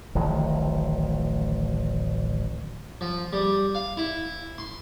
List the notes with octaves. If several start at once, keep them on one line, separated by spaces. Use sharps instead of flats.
D1 A1 D#3 F3
F3
G3
F5
E4
C6